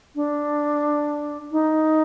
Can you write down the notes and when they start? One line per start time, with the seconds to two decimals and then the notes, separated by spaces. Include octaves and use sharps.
0.15 D4
1.52 D#4